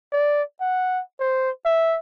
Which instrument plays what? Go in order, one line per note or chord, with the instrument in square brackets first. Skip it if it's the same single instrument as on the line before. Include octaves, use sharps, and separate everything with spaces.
[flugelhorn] D5
F#5
C5
E5